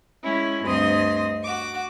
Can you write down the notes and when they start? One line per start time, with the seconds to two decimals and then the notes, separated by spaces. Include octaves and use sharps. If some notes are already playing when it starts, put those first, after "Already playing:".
0.24 G#3 C#4 E4
0.64 D2 G2 C4 D#5 C6 D#6
1.44 F#4 D6